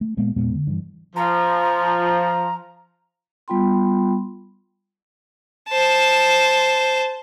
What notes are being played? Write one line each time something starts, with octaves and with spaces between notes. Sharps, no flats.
A3
A#2 G#3 A#3 B3
E2 A#2 G#3 B3
D3
G2 E3
F3 A#5
G3 B3 F4 G5 B5 C6
C5 A5